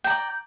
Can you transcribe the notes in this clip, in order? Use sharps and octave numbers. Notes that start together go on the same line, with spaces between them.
D5 G5 A#5